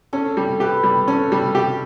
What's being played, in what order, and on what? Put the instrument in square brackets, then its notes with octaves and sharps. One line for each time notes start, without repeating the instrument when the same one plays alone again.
[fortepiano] C#4 [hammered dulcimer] A4
[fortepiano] G3
[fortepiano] G4 [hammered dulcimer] B4
[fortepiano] G3
[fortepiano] C#4 [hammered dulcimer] A4
[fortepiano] G3
G4